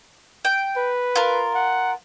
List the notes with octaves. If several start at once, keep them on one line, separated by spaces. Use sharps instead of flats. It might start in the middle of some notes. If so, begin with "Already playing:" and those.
G5
B4
F4 A#4
F#5